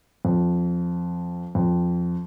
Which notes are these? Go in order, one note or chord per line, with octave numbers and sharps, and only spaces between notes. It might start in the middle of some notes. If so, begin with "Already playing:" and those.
F2
F2